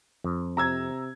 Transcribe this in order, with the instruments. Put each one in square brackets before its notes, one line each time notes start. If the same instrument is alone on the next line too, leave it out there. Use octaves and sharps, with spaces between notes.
[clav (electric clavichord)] F2
[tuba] C3 [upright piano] A#5 E6 G#6